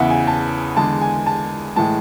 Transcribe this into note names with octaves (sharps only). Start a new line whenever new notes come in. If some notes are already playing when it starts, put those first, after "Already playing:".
Already playing: E2 C#3 E3 E5 F#5
G#5
A5
E2 D3 G#3 A5
G#5
A5
A2 E3 G#3 A5